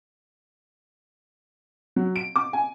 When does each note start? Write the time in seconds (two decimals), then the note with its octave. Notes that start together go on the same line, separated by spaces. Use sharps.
1.96 F#3
2.16 D7
2.36 D6
2.53 G#5